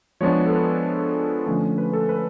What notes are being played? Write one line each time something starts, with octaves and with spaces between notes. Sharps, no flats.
F3 G#3 B3 D4 C#5
A4
B4
D3 F3 A3 C#4
B4
A4
B4